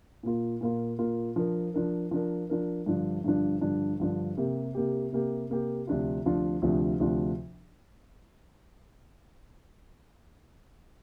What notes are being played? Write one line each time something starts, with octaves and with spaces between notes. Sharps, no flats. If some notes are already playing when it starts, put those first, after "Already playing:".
A#2 A#3 F4
A#2 A#3 F4
A#2 A#3 F4
F3 D4 A#4
F3 D4 A#4
F3 D4 A#4
F3 D4 A#4
G2 D3 F3 D4
G2 D3 F3 D4
G2 D3 F3 D4
G2 D3 F3 D4
C3 A#3 G4
C3 A#3 G4
C3 A#3 G4
C3 A#3 G4
D2 C3 F3 D4 F4
D2 C3 F3 D4 F4
D2 C3 F3 D4 F4
D2 C3 F3 D4 F4